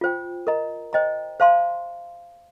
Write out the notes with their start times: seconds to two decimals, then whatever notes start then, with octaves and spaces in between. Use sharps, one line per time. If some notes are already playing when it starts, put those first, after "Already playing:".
0.01 F4 C5 G5
0.47 A#4 D#5 A#5
0.93 C5 D#5 G5 A#5
1.40 C5 F5 A5 C6